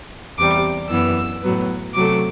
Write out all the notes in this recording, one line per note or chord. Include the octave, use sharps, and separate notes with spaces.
E2 C3 G3 D6
F#2 E3 B3 E6
A2 F#3 B3
C3 F#3 A3 D6